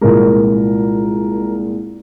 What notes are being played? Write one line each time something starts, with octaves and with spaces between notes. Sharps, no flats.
C2 A#2 F3 G#3 A#4